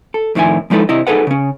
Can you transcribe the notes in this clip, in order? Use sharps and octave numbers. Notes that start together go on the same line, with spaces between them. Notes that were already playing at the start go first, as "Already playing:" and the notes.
A4
F2 A2 D#3 E4 G#5
F3 G#3 D#4 E4 A4 B4
C3 E4 D#5
D#4 G#4 A4 B4 F#5
C#3 C#4